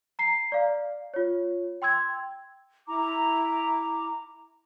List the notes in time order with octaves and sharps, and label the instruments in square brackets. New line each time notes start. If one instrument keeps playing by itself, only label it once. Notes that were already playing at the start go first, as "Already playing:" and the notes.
[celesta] A#5 C7
D5 F5
F4 C#5
G5 C6 E6 G#6
[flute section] E4 A#5 D6